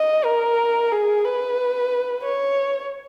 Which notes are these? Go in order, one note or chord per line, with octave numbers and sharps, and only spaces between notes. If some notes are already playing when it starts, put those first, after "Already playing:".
Already playing: D#5
A#4
G#4
B4
C#5